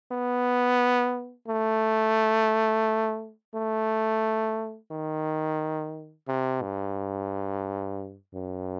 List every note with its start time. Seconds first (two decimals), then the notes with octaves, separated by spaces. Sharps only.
0.11 B3
1.48 A3
3.55 A3
4.91 D#3
6.28 C3
6.62 G2
8.34 F#2